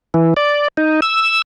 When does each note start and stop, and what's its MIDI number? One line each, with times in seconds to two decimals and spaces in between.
0.14 0.34 52
0.37 0.68 74
0.77 1.00 63
1.02 1.42 88